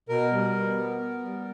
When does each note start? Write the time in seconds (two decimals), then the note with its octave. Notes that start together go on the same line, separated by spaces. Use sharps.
0.09 B2 A#4
0.32 G3
0.55 B2
0.78 B3
1.00 B3
1.24 G3